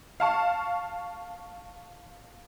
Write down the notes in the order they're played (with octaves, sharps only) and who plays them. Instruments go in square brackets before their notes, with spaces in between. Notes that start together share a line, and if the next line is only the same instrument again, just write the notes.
[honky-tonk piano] F5 A5 C#6